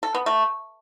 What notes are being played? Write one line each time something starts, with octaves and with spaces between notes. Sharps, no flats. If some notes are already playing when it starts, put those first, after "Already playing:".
A4
B3
A3